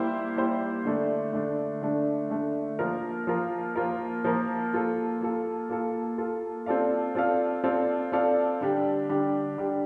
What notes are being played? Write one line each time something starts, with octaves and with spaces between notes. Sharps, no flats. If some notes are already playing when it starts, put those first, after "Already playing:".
Already playing: G3 A#3 E4 G4 C5
G3 A#3 E4 G4 C5
D3 A3 D4
D3 A3 D4
D3 A3 D4
D3 A3 D4
F3 A#3 F4 A#4
F3 A#3 F4 A#4
F3 A#3 F4 A#4
F3 A#3 F4 A#4
A#3 F4 A4
A#3 F4 A4
A#3 F4 A4
A#3 F4 A4
C4 F4 A4 D5 F5
C4 F4 A4 D5 F5
C4 F4 A4 D5 F5
C4 F4 A4 D5 F5
D3 G3 D4 G4
D3 G3 D4 G4
D3 G3 D4 G4